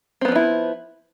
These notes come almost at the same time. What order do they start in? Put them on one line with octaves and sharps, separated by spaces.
C4 B3 F3 D4 E4